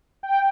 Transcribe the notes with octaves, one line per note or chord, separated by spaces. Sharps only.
G5